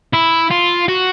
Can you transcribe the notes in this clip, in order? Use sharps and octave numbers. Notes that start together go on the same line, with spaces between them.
E4
F4
F#4